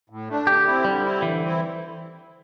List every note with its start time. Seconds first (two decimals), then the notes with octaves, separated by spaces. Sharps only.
0.10 A2
0.28 A3 D4
0.47 D3 G4
0.65 C4 E4
0.84 D3 G3
1.04 C4 E4
1.22 D3 E3
1.42 C4 E4